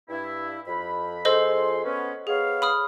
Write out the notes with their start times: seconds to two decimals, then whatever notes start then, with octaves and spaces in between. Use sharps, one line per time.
0.08 G2 E4
0.66 F2 B5
1.25 F2 G#4 A4 C5 D#5 C6
1.84 B3 C#4
2.27 B3 G#4 C#5 F5
2.62 B5 D#6 F6